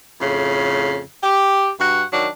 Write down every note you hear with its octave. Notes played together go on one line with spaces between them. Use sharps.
F2 A2 C#3
G4
G2 F#4 F#5
D#3 F#3 D4